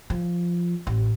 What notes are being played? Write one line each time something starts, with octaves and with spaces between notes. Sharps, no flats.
F3
A1